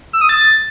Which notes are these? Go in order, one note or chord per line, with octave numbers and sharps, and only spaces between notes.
E6
D#6
A6